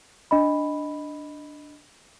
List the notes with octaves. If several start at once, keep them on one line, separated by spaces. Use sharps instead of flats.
D4 D#5 B5